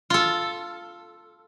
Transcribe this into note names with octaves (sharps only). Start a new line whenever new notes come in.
F4 A4